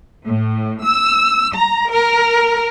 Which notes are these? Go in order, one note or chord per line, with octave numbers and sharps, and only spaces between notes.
A2
E6
A#5
A#4